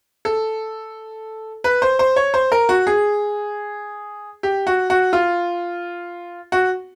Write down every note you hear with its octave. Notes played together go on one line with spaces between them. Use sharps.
A4
B4
C5
C5
C#5
C5
A#4
F#4
G#4
G4
F#4
F#4
F4
F#4